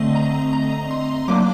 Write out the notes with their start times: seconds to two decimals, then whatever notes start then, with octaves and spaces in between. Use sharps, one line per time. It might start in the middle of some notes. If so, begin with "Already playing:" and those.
Already playing: D3 A3 C4 D#5
0.15 A#5
0.53 A#5
0.91 C6
1.28 F#3 A#3 D4 D6